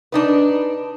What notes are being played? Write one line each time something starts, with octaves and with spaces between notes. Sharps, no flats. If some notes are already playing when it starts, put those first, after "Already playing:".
D4 D#4 B4